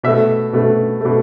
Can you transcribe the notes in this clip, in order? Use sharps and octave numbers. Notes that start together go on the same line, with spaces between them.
B2 A3 E5
B2 A3
B2 A3